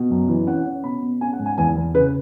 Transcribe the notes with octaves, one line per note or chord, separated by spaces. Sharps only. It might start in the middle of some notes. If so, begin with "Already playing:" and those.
Already playing: B2
F#2
E3
C#4 F#5
C#4
B2 B5
B3
C#4 G#5
F#5
G#2
G#5
E2 G#5
E2
C#3 B4